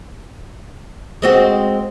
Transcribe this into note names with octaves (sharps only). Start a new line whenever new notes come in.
G#3 C4 F#4